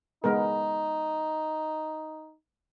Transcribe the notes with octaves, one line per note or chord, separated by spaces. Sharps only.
G#3 B3 D#4 A#4